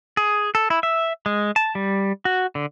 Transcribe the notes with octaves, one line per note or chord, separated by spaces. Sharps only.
G#4
A4
E4
E5
G#3
A5
G3
F#4
D3